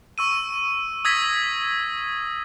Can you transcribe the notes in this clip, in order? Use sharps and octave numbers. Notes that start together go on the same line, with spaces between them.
C#6 E6 D#7
D#6 E6 G#6 A#6 B6